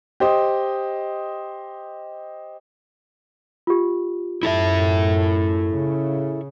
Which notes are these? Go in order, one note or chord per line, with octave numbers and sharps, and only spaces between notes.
G4 C5 D#5
F4 G4
F#2 E4 A4 E5
C#3